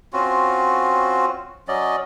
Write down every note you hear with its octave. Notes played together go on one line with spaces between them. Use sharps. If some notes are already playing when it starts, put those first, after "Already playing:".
C4 C#4 F4 F#4
F#3 C#4 D5 D#5